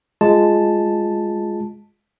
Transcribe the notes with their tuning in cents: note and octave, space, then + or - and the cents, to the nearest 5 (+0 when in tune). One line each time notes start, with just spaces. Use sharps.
G#3 +0 F4 +0 A5 +0